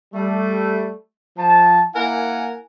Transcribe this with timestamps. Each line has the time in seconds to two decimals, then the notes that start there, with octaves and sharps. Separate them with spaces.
0.14 G3 A3
1.37 F3 A5
1.94 A#3 E4 A#4 F#5 G#5